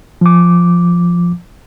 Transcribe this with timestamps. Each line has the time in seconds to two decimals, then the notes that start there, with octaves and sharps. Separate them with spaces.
0.21 F3 D6